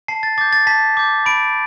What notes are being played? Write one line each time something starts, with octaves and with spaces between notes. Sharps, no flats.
A5 C7
A6
D6 G6 A6
A6
A5 B6
D6 G6
B5 D7